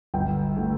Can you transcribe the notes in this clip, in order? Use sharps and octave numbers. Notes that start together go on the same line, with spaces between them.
G1 G5
D3 A3